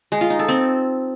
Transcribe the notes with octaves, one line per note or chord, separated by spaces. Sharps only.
G#3
F4
D#4
A4
C4